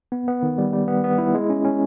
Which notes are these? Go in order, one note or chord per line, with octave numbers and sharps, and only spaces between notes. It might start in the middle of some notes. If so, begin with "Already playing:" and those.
B3
B3
D#3
G3
G3
B3
B3
E4
G#3
C#4
C#4